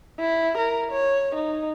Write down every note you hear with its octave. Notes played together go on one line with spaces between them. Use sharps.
E4
A#4
C#5
D#4